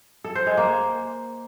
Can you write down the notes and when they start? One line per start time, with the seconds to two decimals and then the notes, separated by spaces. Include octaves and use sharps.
0.24 A4
0.35 C5
0.46 G#3
0.57 A#3